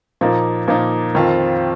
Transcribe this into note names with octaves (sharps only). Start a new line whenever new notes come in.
A#2 F3 A#3 D#4
A#2 F3 A#3 D#4
F2 D#3 C4 F4